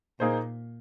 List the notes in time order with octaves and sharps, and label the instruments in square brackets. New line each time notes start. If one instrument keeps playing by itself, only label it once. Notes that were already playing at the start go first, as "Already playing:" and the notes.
[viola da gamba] A#2 [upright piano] A#3 D#4 G#4 C5